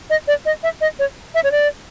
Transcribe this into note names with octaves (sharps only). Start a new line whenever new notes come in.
D#5
D5
D#5
E5
D#5
C#5
E5
C#5
D5